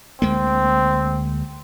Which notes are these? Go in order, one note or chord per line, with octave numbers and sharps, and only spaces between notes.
D2 G#3 A#3 C4